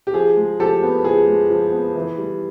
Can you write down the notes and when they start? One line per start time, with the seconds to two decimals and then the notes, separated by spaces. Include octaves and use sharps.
0.07 G4
0.14 F3 G#4
0.37 G#3
0.59 F3 G4 A4
0.83 B3
1.04 F3 G#4
1.27 G#3
1.50 F3
1.72 B3
1.96 E3
2.18 G3